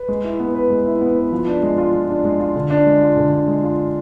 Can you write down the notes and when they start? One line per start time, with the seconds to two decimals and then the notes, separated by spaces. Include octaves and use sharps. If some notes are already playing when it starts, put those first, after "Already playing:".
Already playing: B4
0.08 G#3
0.24 E4
0.40 B3
0.55 B4
0.70 G#3
0.86 E4
1.01 B3
1.17 B4
1.32 F3
1.47 D4
1.63 G#3
1.78 F4
1.94 F3
2.09 D4
2.25 G#3
2.40 F4
2.56 D3
2.70 D4
2.86 G#3
3.01 F4
3.17 D3
3.32 D4
3.48 G#3
3.63 F4